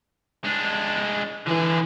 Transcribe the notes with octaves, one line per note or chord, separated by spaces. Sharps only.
G#3 D4
D3 E3 G#4